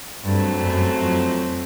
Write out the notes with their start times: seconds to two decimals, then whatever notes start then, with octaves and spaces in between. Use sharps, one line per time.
0.24 G2 F#3 A3 C4
0.63 F#2
1.00 F2